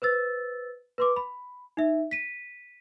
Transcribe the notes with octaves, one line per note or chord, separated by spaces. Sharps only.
B4 C5 E6 A6
B4 C6 D6
B5
D#4 E5
B6 D#7